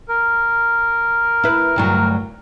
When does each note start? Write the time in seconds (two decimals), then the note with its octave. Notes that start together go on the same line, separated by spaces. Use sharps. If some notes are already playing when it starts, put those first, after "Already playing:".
0.09 A#4
1.44 E4 B4
1.76 D2 G2 F#3